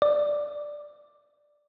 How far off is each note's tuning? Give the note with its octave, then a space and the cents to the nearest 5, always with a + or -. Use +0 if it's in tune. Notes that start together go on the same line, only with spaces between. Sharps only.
D5 +5